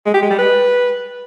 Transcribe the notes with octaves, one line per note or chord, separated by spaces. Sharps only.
G#3
G4
G#3
G3
B4